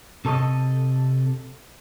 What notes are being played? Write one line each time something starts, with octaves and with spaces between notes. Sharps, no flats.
C3 A4 C#5 D#5